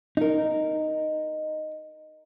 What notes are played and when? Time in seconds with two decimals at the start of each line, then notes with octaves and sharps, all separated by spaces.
0.17 D#4 A#4